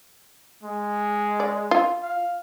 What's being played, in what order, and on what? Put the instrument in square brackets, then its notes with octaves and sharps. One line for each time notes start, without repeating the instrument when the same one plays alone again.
[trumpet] G#3
[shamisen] D5
F4
[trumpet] F5